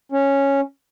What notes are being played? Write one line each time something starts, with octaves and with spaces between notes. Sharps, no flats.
C#4